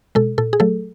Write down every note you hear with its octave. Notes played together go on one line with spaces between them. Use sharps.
B2 G#3 A4
A#2 A4
G#4
F#3 A3 A4